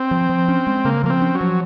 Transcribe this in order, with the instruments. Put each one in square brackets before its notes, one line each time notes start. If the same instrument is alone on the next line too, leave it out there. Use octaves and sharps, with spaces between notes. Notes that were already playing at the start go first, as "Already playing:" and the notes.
Already playing: [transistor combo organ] C4
[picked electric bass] F3
F3
C#4
G#3
[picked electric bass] C#3 [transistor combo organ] A#3
[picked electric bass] F3 [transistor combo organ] A#3
[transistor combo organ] C4
[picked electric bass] C#4
[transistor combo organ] F#3
[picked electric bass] F3